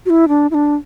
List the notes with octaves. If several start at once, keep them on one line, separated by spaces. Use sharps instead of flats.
F#4
E4
D4
E4
D4